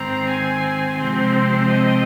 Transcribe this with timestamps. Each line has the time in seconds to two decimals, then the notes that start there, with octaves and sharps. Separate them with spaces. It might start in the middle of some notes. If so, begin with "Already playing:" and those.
Already playing: G#2 D#3 C4 A#5
0.28 G#5
0.98 C3 F3 G#3 C4 C5
1.68 D#5